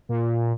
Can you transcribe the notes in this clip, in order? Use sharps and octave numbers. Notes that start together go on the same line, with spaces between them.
A#2